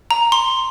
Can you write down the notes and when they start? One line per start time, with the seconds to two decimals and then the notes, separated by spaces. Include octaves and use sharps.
0.11 A#5
0.32 C6